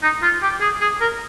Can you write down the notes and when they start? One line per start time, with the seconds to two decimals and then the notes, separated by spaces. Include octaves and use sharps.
0.03 D#4
0.22 F4
0.42 G4
0.61 G#4
0.81 G#4
1.01 A#4